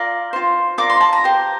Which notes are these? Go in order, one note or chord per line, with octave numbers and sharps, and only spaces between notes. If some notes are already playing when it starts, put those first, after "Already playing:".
Already playing: F4 A#4 D5 D6
F4 C5
F4 A#4 D5 D6
C6
A5
A#5
G4 C5